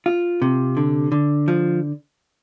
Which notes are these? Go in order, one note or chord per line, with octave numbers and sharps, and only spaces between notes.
F4
C3
D3
D3
F3